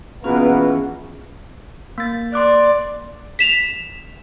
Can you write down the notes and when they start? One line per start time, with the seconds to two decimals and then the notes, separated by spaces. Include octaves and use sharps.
0.24 B2 E3 A#3 B3 C#4 F4 G#4 B4
1.98 A#3 A6
2.34 D5 C6 D6 F#6
3.39 B6 E7 F7